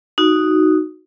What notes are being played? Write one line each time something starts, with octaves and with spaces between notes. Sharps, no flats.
D#4 F#4